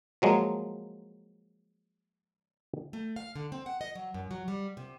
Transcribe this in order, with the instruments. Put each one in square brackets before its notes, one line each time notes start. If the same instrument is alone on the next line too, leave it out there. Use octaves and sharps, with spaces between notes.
[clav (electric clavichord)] F3 F#3 G#3 A#3
[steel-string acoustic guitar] A3
F5
D3
C4
F#5
D#5
F#3
F#2
F#3
G3
C3